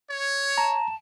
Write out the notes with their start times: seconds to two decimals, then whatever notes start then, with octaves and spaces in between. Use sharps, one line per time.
0.10 C#5
0.58 A5 A#5